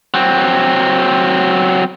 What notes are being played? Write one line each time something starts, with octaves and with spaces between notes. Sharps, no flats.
F#3 C4